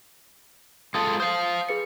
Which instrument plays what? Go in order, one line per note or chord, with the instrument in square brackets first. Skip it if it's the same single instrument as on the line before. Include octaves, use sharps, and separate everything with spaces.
[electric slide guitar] G#3 F4 A4 [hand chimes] D#6
[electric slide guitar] C5 F5 [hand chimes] D#6
[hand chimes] G#4 B4 C#7